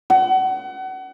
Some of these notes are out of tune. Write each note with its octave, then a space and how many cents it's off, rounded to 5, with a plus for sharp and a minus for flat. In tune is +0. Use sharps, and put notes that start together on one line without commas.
F#5 +30